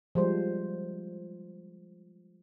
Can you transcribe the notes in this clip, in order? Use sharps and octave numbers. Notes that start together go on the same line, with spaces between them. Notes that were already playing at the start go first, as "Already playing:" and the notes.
F3 G3 G#3 C5